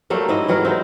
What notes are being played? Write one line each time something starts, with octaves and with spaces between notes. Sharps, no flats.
F#3 G3 A3 A#3
G#2 E4 D#5
E3 F#3 G3 A#4
C4 D#4 E4